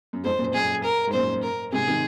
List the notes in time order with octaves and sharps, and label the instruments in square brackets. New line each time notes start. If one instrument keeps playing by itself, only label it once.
[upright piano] F#2
[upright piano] F2 G#2 [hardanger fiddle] C5
[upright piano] F#2 A#2
[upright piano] F#2 A#2 [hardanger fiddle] G#4
[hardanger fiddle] A#4
[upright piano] G#2
[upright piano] F#2 A#2 [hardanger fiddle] C5
[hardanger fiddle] A#4
[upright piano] G#2 C3 [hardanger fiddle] G#4
[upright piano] C3 D#3